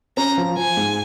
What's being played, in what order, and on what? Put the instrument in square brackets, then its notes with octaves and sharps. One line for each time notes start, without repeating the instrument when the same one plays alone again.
[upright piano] C#4 [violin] A#5
[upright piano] F3
[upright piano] F3 [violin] G#5
[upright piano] G#2